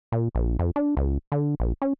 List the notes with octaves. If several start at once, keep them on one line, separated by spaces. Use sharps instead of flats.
A#2
A#1
F2
D4
C#2
D3
A#1
C#4